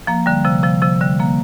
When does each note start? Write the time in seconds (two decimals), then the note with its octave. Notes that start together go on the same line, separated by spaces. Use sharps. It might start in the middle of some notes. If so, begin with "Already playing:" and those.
0.07 F3 A#3
0.26 D3 G3
0.45 C3 F3
0.64 C3 F3
0.82 C3 F3
1.01 D3 G3
1.19 F3 A#3